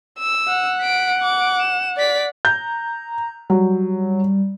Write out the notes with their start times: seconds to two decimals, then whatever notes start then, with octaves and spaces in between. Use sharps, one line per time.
0.19 E6
0.48 F#5
0.81 B6 D7
1.22 D6
1.60 E7
1.97 D5 B6
2.45 A#5 G6
3.50 F#3 G3